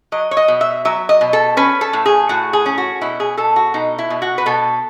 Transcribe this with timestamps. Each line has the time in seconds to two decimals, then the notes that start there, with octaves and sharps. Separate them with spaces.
0.12 F#3 D#5
0.31 C#5
0.37 D#5
0.48 B2
0.61 E5
0.85 F#3 E5
1.09 D#5
1.21 B2
1.33 A4
1.57 C#4 B4
1.81 A4
1.93 A2
2.06 G#4
2.29 A2 F#4
2.53 G#4
2.66 C#4
2.78 F#4
3.01 B2 E4
3.20 G#4
3.38 B2 A4
3.56 F#4
3.74 B2 D#4
3.98 E4
4.10 B2
4.22 F#4
4.38 B4
4.46 B2 A4